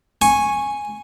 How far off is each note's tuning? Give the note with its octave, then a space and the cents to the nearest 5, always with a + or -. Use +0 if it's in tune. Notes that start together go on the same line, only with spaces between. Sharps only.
G#5 +0 C#6 -15